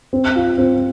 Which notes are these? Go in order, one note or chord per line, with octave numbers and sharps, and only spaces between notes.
C4
F4
C4